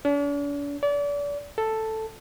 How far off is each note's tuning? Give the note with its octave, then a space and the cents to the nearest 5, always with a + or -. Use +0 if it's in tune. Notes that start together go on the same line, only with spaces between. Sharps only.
D4 -45
D5 -35
A4 +5